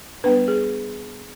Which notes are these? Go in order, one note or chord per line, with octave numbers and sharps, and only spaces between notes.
G3 B3 D4 B4
G#4